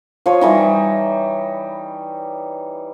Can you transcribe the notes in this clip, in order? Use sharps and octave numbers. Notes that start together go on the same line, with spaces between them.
F3 C#5
E3 G3 D#4